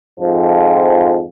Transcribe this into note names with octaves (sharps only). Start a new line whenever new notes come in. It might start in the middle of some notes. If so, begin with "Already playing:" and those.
F2 G#2 F3